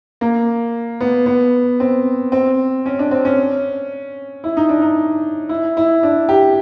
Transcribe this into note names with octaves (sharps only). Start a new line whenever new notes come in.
A#3
B3
B3
C4
C4
C#4
D4
C4
C#4
E4
D#4
D4
D#4
E4
E4
D4
G4